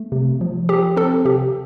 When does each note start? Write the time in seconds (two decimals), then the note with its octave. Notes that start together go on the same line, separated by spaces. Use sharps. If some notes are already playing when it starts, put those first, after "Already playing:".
Already playing: A3
0.12 C3
0.41 F3
0.69 F3 G4
0.96 C4 A4
1.25 C3 G4